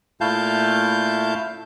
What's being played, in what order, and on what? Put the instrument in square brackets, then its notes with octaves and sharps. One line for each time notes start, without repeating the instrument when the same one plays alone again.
[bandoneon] A#2 A3 E4 F5 A5 G6